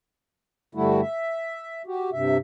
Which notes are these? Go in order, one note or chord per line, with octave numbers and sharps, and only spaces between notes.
G2 D3 G3 A3 E4 F#4
E5
F#4 G4
G2 C3 E5